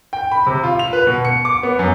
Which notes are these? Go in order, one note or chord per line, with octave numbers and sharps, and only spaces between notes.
G5
B5
C3
F4
F7
B4
B2
C#7
D6
B3
F#2